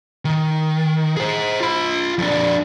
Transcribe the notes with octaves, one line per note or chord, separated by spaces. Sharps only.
D#3
G#4 C5
F4 B5
F2 D4